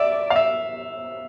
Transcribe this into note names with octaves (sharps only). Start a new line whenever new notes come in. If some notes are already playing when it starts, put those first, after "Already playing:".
Already playing: D5 E5
F5
E5